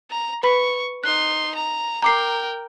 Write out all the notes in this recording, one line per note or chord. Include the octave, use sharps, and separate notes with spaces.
A#5
B4 B5 C#6 B6
D#4 C6 F#6
A#5
A#4 G5 A#5 D6 C7